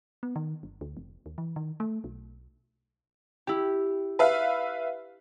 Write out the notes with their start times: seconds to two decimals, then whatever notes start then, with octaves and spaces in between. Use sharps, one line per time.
0.23 B3
0.36 D#3
0.63 G1
0.81 D2
0.97 F1
1.26 D#2
1.38 E3
1.56 D#3
1.80 A3
2.04 B1
3.47 E4 G4
4.19 B4 E5 F5